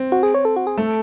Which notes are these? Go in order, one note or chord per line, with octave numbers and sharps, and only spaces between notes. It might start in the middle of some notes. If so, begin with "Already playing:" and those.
Already playing: C4
F#4
G#4
C#5
A4
F#4
G#4
A3 A4